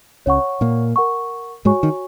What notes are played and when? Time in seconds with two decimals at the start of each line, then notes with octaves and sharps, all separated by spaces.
0.26 C#2 C#3 C#5 F#5 C#6
0.61 A#2 A#3
0.96 A#4 F#5 C#6
1.65 G#2 G#3 F#4 C#5 G#5 C#6
1.83 D#3